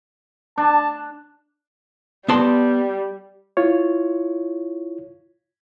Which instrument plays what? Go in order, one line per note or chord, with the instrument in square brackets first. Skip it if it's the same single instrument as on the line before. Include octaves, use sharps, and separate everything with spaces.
[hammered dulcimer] D4 [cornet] A5
[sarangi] G3 [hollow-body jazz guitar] B3 A5 C6
[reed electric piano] E4 F4 C#5